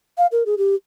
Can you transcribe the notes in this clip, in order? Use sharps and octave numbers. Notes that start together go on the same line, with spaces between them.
F5
A#4
G#4
G4